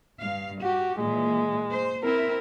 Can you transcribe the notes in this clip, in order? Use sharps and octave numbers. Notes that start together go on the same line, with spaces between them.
G2 F5
F#4 G4
A#2 E3 G#3
C5
C4 E4 A#4